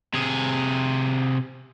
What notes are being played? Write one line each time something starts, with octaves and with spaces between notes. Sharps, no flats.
C3 G#4